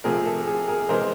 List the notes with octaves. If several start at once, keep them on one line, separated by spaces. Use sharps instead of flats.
C3 F3 A3 C4 G#4 A#4
A4
G#4
G#4 A#4
C3 E3 G#3 A#4 C5